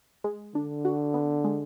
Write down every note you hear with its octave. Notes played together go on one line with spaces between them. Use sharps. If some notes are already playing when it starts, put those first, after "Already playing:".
G#3
D3 D4
F#4
B3
G#3